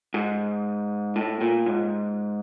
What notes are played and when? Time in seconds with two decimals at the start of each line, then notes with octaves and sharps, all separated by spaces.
0.14 G#2
1.16 A2
1.41 A#2
1.66 G#2